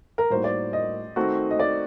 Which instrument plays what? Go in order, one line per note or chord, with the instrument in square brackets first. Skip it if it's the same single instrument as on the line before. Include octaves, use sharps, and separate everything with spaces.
[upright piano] A#4
[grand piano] A2 G3 A#3 D#4 F#4 [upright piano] C5
[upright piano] D5
D#5
[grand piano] D#3 A3 C4 D#4 F#4
[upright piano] D#5
D5